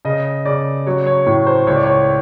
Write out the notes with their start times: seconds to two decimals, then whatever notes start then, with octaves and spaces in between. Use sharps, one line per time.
0.05 C#3 D#5
0.46 C#3 D5
0.86 F#3 C#5
1.06 C#5
1.26 A2 C#5
1.47 C5
1.67 C#2 C#5
1.76 D5
1.86 C#5